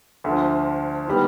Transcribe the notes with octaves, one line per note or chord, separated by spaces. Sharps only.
D2 D3 F3
D#3 G3 B3